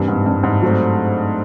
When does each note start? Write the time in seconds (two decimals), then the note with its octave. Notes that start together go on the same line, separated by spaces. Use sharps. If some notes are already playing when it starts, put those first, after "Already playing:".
Already playing: G2 C3 E3 G3 A#3
0.08 G#2
0.26 G2
0.43 G#2
0.62 F#3 A3 C4